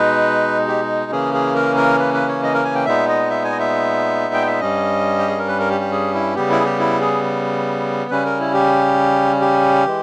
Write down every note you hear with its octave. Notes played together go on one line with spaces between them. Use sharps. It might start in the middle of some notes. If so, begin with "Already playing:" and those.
Already playing: B2 G#3 D#4 B4
G4
C#3 E3 A#3 C#4 G#4
G#4
A#4
A#4
B4
B4
C#5
D#5
A#4
G#5
G5
A#2 G#3 B3 D#4 E5
D#5
E5
G#5
D#5
E5
G5
E5
G2 G3 C#4 D#5
G4
G#4
A#4
B4
A#4
G4
G4
G#4
E4
C#3 G3 B3 G4
E4
G#4
G4
E4
G#4
C#3 G3 C#4 B4
A#4
E4
G4
G4
E3 G#3